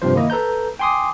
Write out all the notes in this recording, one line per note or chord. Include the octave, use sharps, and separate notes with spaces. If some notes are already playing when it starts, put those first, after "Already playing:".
G2 C3 F3 C5
D#3 A#3 E4 D#5
A4 B4 A#5 G6
G5 G#5 C6 D6 D#6